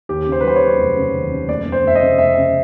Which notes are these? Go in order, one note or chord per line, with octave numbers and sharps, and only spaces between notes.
D#2 G4
C#3
C5
B4
F#3 C5
C#5
C#3
F1
C#3
D#2
C#3
F1 D5
F1
C5
F1 E5
D#5
C#3
F1 E5
C#3 E5